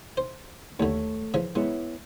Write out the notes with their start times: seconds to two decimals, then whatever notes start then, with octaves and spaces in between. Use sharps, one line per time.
0.17 C5
0.80 D#2 D3 A3 C#5
1.34 C#3 E3 F3
1.55 G#3 B3 E4 C#5